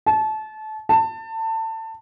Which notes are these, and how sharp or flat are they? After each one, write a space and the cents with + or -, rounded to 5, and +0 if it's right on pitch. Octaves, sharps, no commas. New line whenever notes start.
A5 -25
A5 +25